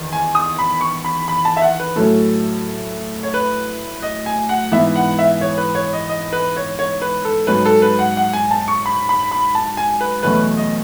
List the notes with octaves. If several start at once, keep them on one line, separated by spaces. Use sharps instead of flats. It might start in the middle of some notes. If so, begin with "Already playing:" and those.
Already playing: E2 D#3
G#5
D#6
B5
C#6
B5
B5
A5
E5
F#5
B4
A2 F#3 C#4 A4
C#5
B4
D#5
G#5
F#5
G#2 E3 B3 E5
F#5
E5
C#5
B4
C#5
D#5
D#5
B4
C#5
C#5
B4
A4
G#2 F#3 C#4 B4
A4
B4
F#5
F#5
G#5
A5
C#6
B5
B5
B5
A5
G#5
B4
E2 B2 F#3 A3 C#4 B4
D#5